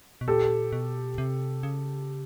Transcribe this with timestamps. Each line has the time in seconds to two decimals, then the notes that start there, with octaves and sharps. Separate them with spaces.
0.21 B2
0.28 A#2 G4 A4
0.72 B2
1.18 C3
1.63 C#3